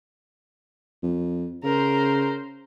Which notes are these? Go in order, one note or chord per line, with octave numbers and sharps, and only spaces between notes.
F2
C#3 A#4 C5